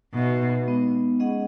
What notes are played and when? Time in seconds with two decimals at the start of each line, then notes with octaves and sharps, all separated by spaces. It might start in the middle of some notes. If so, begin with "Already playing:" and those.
0.13 B2 D#4 F#4 B4 E5
0.67 G#3 B3 D#4
1.19 G#3 C#4 G#4 D#5 F#5